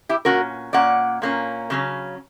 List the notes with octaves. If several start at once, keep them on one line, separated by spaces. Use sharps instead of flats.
E4 G4
A#2 F#3 C#4 F#4 A#4
A#2 A#3 C#4 D5 F#5
A#2 A#3 C#4
C#3 F#3 C#4